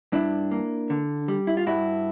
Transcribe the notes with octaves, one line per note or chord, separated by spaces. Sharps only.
G2 D4 E4
A#3
D3
G3
E4
F4
G2 E4 F#4